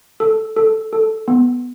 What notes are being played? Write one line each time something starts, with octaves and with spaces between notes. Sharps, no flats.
A4
A4
A4
B3